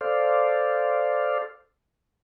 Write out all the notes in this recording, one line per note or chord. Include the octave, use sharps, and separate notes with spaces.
A4 C5 D5 F5